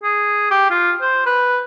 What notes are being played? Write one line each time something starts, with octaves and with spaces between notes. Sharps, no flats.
G#4
G4
F4
C5
B4